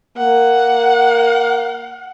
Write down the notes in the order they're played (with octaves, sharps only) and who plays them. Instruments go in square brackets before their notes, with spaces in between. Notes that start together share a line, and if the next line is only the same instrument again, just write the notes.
[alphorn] A#3 [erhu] F#5